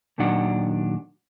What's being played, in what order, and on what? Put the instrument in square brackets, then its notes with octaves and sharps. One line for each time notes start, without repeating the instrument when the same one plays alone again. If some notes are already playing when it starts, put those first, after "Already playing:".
[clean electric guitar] D#2 A#2 D#3 F#3 D4 F#5